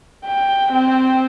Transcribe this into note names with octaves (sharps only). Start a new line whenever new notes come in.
G5
C4